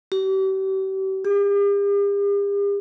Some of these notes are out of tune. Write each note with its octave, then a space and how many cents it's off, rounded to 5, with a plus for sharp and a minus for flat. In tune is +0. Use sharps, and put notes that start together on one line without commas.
G4 -40
G4 +45